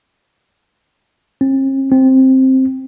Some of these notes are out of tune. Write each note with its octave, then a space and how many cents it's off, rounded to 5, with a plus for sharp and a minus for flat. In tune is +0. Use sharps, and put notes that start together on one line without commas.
C4 +45
C4 +5